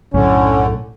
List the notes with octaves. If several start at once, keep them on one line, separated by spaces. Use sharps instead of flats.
B1 F#2 A2 D3 C#4